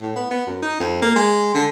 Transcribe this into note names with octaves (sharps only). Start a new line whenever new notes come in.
A2
B3
B3
F#2
D#4
F2
A#3
G#3
D3